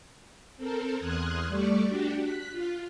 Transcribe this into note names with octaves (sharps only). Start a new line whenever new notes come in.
C4 A4 A#4
E2 C6 D#6 F6 F#6 G#6
G3 A3 D5 C#6
D4 F#4 G4
F#6 B6
F4